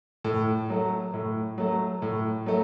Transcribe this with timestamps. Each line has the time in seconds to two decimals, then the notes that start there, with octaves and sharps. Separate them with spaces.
0.25 A2
0.70 F#3 A3
1.14 A2
1.58 F#3 A3
2.02 A2
2.46 F#3 A3